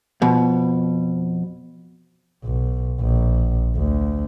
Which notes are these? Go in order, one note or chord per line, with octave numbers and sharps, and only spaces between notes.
F2 B2
B1
A#1
D2